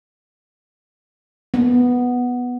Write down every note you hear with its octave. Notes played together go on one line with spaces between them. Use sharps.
B3